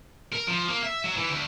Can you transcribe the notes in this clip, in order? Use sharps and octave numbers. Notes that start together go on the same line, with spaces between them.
A#4
F3
A#3
E5
F#3
E3
D2